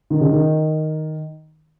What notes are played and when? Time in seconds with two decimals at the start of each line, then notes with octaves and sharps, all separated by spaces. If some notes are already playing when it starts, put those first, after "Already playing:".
0.10 D#3
0.21 C#3
0.31 D#3